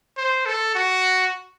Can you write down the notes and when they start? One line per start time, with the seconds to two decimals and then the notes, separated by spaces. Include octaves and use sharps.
0.17 C5
0.46 A4
0.75 F#4